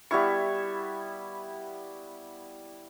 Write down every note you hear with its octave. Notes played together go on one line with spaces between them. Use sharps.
G3 B3 E4 C#6